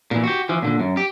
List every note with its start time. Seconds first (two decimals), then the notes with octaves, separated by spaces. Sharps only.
0.11 A#2 E3
0.24 F#4 G4
0.49 E3 F3
0.62 A#2 D3
0.80 F#2
0.97 G4